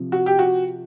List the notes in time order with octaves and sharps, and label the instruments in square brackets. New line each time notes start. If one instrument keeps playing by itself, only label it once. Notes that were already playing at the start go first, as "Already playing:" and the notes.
Already playing: [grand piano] C3 F3
[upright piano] F#4
G4
F#4